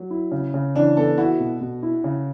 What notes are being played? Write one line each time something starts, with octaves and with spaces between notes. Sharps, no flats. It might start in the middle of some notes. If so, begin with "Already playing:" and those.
Already playing: F#3
E4
C#3
C#3
E3 D4
B3 A4
E4 F#4
B2
B2
E4
C#3